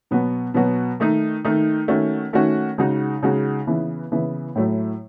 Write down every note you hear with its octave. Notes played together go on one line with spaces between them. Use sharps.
B2 F#3 B3 F#4
B2 F#3 B3 F#4
D#3 A3 D#4
D#3 A3 D#4
D#3 A3 C#4 F#4
D#3 A3 C#4 F#4
C#3 G#3 D#4 F#4
C#3 G#3 D#4 F#4
C#3 E3 B3 E4
C#3 E3 B3 E4
A2 F#3 A3 E4